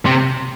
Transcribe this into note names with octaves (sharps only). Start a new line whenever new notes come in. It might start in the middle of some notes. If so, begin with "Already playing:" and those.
C3